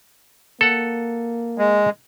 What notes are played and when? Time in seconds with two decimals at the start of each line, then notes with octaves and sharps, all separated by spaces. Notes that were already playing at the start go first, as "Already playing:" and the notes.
0.61 A#3 A4 F#5
1.58 G#3